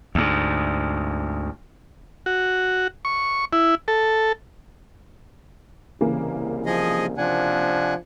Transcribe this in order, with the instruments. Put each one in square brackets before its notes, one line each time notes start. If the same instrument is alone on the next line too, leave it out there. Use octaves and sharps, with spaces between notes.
[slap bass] D2 G#2
[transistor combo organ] F#4
C#6
E4
A4
[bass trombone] C2 [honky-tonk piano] C#3 E3 A#3
[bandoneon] F3 G#4 D#5
[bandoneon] C3 [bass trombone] F3 [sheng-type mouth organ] D4 F#5 G#5